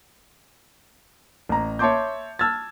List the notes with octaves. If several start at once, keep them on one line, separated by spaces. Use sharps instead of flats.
A1 A#5
C#5 E5 A5 C6 D6 G6
A5 E6 F6 G#6 A6